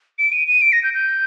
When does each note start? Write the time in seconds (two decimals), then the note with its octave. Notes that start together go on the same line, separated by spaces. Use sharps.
0.19 D7
0.32 D#7
0.48 D#7
0.62 D7
0.72 A#6
0.83 G6
0.94 G6